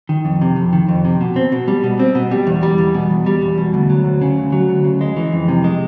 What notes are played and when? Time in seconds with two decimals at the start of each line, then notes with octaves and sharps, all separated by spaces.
0.09 D#3
0.25 F2
0.41 C3
0.56 F2
0.73 D#3
0.88 F2
1.05 C3
1.21 B2
1.36 C4
1.52 B2
1.68 G3
1.84 B2
1.99 C4
2.15 B2
2.31 G3
2.47 E2
2.63 G3
2.78 E2
2.94 B2
3.10 E2
3.26 G3
3.42 E2
3.58 B2
3.74 D2
3.90 F#3
4.05 D2
4.21 C#3
4.37 D2
4.52 F#3
4.69 D2
4.84 C#3
5.01 G#3
5.17 E3
5.32 F2
5.48 C3
5.64 G#3